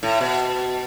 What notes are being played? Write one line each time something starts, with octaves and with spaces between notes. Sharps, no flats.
A2
B2